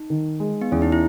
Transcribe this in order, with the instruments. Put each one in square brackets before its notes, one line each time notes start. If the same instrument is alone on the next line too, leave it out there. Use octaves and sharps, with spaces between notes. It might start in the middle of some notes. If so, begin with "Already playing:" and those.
Already playing: [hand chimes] D#4
[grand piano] D#3
G#3
[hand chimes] B3
[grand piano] E2 [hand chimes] C#4
[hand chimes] D#4
E4